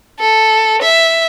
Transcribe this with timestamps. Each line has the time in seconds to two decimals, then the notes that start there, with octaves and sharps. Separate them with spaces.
0.20 A4
0.82 E5